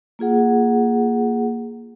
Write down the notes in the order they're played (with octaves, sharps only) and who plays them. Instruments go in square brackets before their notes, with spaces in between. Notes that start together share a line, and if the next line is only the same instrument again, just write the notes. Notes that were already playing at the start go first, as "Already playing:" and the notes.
[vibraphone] A#3 F4 G#4 F#5